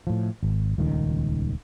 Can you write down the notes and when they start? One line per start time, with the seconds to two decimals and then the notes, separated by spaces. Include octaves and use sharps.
0.07 A2 F3
0.43 G#1
0.78 D#1 C#2 D#3